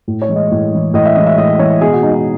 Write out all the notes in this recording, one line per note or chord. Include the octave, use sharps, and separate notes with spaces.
A2
C#5
E3 G#3
D#5
A2
E3 G#3
A2 D#5
E5
E3 G#3 D#5
E5
A2 D#5
E3 G#3 C#5
B2 G#4
F#4
G#3 D#4
D#4